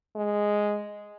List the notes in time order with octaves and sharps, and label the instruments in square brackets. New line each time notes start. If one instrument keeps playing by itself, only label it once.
[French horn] G#3